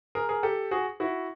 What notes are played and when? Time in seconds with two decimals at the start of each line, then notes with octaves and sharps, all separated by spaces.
0.15 G#4 A#4
0.29 G#4 A#4
0.43 G4 A4
0.71 F#4 G#4
1.00 E4 F#4